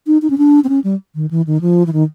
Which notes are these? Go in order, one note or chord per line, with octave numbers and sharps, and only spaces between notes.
D#4
D#4
C#4
D4
C4
C#4
G3
D#3
E3
D#3
F3
E3
D#3